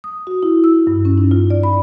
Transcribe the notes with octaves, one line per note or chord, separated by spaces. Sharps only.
D#6
F#4
E4
E6
G2
C#4
D#4
F4
D5
B5